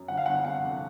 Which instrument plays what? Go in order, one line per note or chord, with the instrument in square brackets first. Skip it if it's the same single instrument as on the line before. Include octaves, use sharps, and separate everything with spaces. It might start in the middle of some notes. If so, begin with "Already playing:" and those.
Already playing: [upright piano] F#2
G1 F#5
F5
G1 F#5
C3 F#5
F2